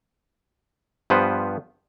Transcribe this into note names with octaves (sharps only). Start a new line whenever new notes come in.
G2 F3 B3 B4 C5